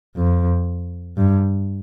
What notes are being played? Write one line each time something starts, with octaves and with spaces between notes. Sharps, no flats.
F2
G2